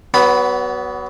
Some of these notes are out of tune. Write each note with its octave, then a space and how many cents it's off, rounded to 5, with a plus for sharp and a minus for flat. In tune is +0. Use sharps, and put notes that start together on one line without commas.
F#3 +30 B3 +0 B5 +0